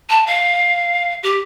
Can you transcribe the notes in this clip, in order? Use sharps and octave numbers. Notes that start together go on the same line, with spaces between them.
A5
F5
G4